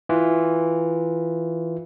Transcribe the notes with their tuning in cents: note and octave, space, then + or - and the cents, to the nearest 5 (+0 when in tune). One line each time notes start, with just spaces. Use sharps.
E3 +0 F4 +0